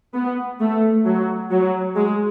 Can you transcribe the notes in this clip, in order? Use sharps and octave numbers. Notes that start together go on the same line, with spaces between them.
B3
A3
F#3
F#3
G#3